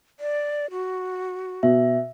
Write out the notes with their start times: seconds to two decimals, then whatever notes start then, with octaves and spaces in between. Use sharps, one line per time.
0.20 D5
0.71 F#4
1.63 B2 E5